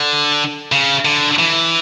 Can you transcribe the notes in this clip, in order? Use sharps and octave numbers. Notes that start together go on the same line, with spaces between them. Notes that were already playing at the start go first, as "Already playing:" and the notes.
Already playing: D3
C#3
D3
E3